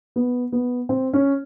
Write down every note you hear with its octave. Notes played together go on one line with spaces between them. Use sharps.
B3
B3
C4
C#4